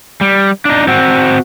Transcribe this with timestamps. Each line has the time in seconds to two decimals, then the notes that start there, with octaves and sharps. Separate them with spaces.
0.21 G3
0.65 D4 D#4
0.88 C4 F#4